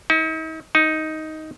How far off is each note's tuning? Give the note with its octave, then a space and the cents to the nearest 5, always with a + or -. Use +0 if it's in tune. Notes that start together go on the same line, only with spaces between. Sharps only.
D#4 +45
D#4 +10